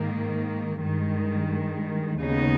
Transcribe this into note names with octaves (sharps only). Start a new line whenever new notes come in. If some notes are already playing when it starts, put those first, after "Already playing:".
Already playing: G#2 D#3 A#3
G2 D#3 G#3
D#2 C#3 G#3 B3 D#4